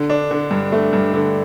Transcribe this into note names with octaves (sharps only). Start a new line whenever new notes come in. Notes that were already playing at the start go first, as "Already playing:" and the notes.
Already playing: D3
D4
D3
G2
A3
G2
D3